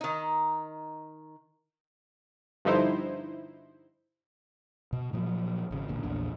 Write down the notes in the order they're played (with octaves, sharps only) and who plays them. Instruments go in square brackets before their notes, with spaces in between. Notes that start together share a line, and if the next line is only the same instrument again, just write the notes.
[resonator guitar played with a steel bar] D#3 D#4
[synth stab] G2 D3 F3 D#4 E4 C5
[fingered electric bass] B2
A#2 F3 F#3 A#3
G#1 C#3
A1 A#2 D3
A#1 E2 A#2 D4